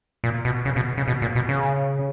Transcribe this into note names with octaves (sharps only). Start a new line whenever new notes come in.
A#2
B2
C#3
B2
C#3
B2
A#2
B2
C#3